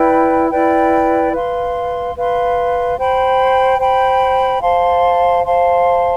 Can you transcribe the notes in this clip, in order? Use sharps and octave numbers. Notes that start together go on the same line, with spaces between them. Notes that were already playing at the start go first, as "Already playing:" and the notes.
Already playing: E4 B4 D5 G5
E4 B4 D5 G5
B4 F5 C6
B4 F5 C6
C5 G5 B5
C5 G5 B5
C5 F5 A5 C6
C5 F5 A5 C6